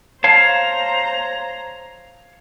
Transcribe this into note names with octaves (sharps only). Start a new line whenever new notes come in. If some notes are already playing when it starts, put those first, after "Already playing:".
C5 C#5 F5 A5 A#5